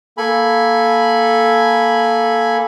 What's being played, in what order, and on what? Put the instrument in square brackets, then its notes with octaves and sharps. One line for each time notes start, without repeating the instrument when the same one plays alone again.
[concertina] A#3 A4 G#5 B5